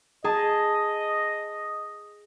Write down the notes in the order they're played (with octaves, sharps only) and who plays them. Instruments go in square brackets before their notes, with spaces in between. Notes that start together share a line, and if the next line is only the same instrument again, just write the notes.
[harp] G#4 A5 [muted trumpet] D#5